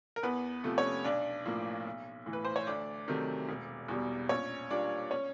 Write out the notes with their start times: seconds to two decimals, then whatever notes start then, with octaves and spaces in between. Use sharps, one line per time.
0.16 A#4
0.23 E2 B3 B4
0.64 C3 F3 A3
0.78 C#4 C#5
1.04 B1 D4 D5
1.46 A2 F3 A#3
1.85 B1
2.26 A2 E3
2.33 B4
2.45 C5
2.56 C#5
2.67 D2 D4 D5
3.08 C3 D#3 F#3 A3
3.49 E1
3.89 E2 B2 G3
4.29 A#1 C#4 C#5
4.70 A#2 G3 A#3 D4 D5
5.11 C#4 C#5